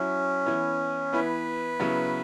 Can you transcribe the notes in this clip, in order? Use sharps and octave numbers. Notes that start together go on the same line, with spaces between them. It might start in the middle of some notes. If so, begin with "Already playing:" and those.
Already playing: F#3 C#4 E4
E3 B3 E4
E3 B3 E4 B4
C#3 F#3 B3 E4